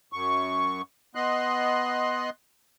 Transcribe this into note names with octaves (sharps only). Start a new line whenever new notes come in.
F#2 C#6
B3 D#5 C6 F#6